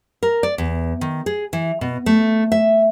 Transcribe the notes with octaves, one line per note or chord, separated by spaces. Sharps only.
A#4
D5
E2
D#3
G#4
E3
B2
A3
E5